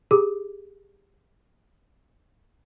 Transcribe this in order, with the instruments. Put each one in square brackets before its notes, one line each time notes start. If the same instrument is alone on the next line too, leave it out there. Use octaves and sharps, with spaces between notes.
[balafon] G4 G#4 D6